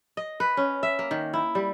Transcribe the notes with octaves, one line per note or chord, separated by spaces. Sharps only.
D#5
B4
C#4
E5
A#3
D#3
E4
G3